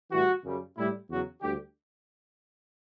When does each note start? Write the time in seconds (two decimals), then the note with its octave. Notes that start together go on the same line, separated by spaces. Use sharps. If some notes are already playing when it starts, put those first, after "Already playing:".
0.12 A2 E3 G3 F#4
0.44 F#2 C#3 G3
0.77 A2 G3 E4
1.09 E2 C#3 F#3 F#4
1.41 D2 D3 G3 G4